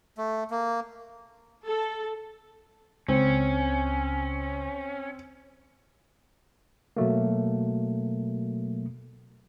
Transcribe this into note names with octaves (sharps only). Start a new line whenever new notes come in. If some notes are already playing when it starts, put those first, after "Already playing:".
A3
A#3
A4
C#2 C4 C#4
B2 F#3 A3 A#3